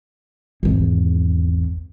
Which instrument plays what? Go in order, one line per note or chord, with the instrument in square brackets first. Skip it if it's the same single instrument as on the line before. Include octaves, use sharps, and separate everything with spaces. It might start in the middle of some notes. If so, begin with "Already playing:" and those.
[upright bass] G#1 E2